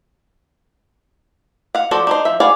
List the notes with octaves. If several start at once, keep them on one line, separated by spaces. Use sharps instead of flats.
F5 F#5
F3 F#4 A4 C5 D5
D4 D#4 C5
F3 E5
G#4 B4 D5 F5 F#5